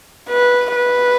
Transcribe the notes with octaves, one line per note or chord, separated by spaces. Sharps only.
B4
B4